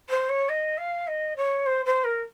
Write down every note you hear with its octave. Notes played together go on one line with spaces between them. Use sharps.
C5
C#5
D#5
F5
D#5
C#5
C5
C5
A#4